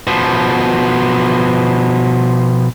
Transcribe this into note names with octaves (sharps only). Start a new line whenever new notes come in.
B2 F3